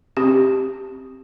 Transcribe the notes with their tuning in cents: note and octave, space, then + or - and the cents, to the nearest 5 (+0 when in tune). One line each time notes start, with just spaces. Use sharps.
C4 +5 G4 +0